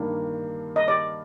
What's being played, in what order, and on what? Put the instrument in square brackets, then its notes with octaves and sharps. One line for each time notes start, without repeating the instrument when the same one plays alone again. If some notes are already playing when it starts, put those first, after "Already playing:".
Already playing: [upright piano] G2 D#3 A#3 D4
[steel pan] D#5
D5